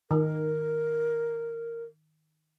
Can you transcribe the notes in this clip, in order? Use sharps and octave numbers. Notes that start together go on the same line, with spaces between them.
D#3 A#4